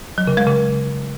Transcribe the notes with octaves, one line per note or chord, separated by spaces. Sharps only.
F#3
C#3
G#3
C#3